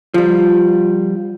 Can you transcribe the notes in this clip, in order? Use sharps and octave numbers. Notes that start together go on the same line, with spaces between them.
F3 G3